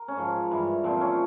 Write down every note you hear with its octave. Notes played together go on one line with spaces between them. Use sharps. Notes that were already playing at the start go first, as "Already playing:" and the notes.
Already playing: A#4
C#4
G#2 F3
G2 E3
A#2 F3 C4
C#4